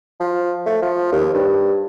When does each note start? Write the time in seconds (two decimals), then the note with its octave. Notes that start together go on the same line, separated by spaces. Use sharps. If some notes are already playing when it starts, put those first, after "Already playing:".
0.20 F3
0.66 A3
0.82 F3
1.12 D#2
1.34 G2